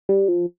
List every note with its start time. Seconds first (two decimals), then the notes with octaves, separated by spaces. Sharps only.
0.09 G3
0.28 F3